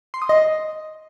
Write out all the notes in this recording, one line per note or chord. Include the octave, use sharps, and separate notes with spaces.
C6
D#6
D#5